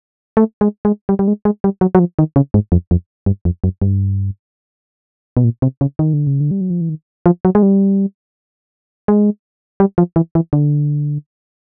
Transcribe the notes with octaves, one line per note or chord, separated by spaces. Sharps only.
A3
G#3
G#3
G3
G3
G#3
G#3
G3
F#3
F#3
F3
D#3
C#3
G#2
F2
F2
G2
F2
F#2
G2
B2
A#2
C3
C#3
D#3
D3
C#3
D3
G3
F#3
F3
E3
D#3
F3
F#3
G#3
G3
G#3
G3
F3
E3
E3
D3